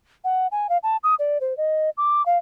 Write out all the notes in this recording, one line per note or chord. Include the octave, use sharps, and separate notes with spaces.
F#5
G#5
F5
A5
D#6
D5
C5
D#5
D6
F5